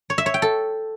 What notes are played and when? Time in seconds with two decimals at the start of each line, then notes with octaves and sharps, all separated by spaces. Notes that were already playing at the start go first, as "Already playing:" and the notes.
0.10 C#5
0.18 E5
0.26 C#5
0.34 G5
0.42 A4